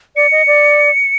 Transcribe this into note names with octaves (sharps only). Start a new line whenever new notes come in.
D5 C#7
D#5
D5